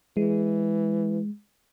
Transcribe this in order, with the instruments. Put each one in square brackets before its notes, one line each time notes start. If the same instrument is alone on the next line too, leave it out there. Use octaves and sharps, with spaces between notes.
[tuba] E3 [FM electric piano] G#3